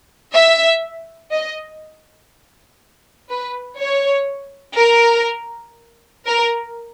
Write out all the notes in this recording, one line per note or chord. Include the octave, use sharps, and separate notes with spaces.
E5
D#5
B4
C#5
A#4
A#4